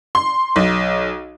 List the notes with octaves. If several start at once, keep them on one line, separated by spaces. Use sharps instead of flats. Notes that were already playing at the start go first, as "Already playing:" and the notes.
C6
B1